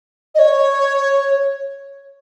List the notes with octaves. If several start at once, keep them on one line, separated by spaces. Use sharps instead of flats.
D#5
C#5